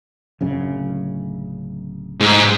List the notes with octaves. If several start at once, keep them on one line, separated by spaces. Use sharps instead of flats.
D1 F#2 C#3
G#2